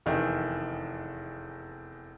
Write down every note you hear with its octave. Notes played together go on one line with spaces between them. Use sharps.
F1 E2 D#3 E3